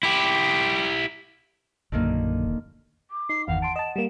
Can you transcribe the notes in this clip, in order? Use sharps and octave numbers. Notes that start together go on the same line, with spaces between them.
E4 G4
A#1 F#2 D3 D#3 A#3
E1
D6
D#4 C7
G1 E2 D#3 F5 F#5
A5 C6 D7
D#5 A5 E7
G3 A#3 E7